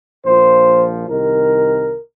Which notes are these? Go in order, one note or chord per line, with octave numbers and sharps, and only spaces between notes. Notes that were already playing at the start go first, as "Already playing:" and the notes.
A#1 A#2 F3 C5
C2 C3 D#3 A#4